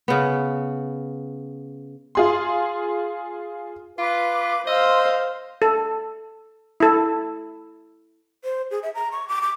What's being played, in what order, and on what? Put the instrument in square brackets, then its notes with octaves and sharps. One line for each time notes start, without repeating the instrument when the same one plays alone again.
[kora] C#3 B3
[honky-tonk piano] F4 G#4 C6
[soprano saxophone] F4 [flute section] B4 D6
[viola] C5 F5 [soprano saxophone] D#5 [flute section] C6 E6
[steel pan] A4
E4 A4
[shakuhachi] C5
G#4
E5
A#5
C#6
D6
D6